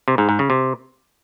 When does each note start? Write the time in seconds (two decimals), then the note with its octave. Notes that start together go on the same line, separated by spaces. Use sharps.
0.08 C3
0.18 G#2
0.29 G#2
0.39 C#3
0.50 C3